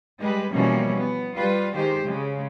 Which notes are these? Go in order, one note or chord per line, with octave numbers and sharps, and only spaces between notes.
G3 G#3 G4 B4
B2 E3 F3 G3 A#3 C#4
B3
G3 F4 B4
D#3 G#3 G4 C5
C#3 G#3